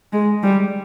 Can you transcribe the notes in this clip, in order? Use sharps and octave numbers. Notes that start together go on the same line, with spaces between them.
G#3
G3